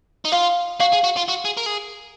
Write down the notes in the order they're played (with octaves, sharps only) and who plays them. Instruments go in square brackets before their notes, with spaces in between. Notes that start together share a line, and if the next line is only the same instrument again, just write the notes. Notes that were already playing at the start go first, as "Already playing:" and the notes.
[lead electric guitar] D#4
[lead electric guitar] F4 [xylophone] F5
[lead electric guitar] F#4 [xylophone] F5
[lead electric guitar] G#4
F#4
F4
F#4
G#4
A#4
G#4